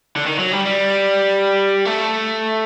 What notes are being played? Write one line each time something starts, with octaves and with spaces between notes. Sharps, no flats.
D3
D#3
F#3
G3
G3
A3